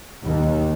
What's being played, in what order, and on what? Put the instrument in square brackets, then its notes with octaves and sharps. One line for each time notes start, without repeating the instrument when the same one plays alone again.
[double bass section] D#2